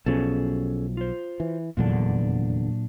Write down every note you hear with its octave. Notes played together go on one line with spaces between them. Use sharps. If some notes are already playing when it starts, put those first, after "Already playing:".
B1 B2 F3 C#4 G#4 A4
F4 C5
E3
F1 E2 A#2 D3 F#3 D4